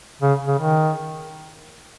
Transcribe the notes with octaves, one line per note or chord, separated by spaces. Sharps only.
C#3
C#3
D#3